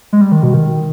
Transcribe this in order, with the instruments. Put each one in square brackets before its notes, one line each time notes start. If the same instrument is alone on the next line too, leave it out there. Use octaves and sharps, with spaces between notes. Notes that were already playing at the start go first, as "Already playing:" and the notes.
[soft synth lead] G#3
G3
D#3
B2
D#3